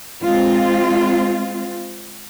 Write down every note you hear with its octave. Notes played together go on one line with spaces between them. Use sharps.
G#3 C4 F4